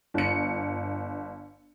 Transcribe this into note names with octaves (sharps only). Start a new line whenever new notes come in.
G1 C#7